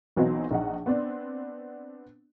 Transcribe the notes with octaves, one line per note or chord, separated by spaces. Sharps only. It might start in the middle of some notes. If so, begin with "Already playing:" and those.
B1 E3 F#3 B3 C4 D#4
A#1 D#4 F#5
B3 C4 D4